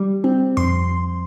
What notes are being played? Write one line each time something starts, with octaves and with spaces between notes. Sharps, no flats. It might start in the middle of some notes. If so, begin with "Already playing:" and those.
Already playing: G3
C4
F2 C6